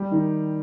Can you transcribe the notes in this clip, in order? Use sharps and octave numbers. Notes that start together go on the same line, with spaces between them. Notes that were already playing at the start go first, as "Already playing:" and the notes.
Already playing: G3
D#3